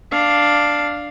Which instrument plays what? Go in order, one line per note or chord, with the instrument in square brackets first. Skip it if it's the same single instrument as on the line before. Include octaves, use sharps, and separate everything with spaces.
[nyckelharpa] D4 F5